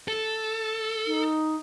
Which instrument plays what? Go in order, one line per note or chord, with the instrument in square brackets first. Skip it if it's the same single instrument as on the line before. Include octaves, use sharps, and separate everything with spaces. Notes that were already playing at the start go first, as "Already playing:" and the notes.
[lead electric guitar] A4
[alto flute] D#4